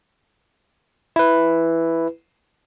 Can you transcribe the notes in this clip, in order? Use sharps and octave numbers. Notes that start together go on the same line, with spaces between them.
E4 B4